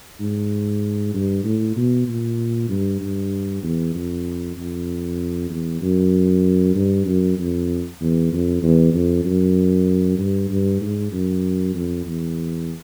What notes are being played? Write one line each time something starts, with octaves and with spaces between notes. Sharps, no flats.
G#2
G2
A2
B2
A#2
G2
G2
E2
F2
F2
E2
F#2
G2
F#2
F2
E2
F2
E2
F2
F#2
G2
G2
G#2
F#2
F2
E2